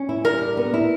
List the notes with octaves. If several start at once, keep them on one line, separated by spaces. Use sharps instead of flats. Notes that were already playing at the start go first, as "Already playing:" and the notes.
Already playing: C#4
E4
G3 A#4
D3
B3
E4